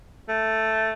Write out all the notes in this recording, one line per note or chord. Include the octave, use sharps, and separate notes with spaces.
A3